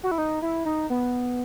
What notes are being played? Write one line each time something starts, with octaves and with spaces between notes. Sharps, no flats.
F#4
E4
D#4
E4
D#4
B3